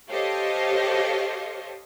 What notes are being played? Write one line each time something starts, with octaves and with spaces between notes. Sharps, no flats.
G4 A4 C5 C#5 D#5 F5